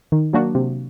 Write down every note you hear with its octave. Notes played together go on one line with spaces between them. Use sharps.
D#3
F#3 A#3 D4 F#4
C3